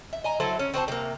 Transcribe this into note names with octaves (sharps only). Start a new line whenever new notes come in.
E5
D#5 G#5 A#5
F#3 E4 A4 C5
C#4
C4 F#4 C5 A5
C3 A#3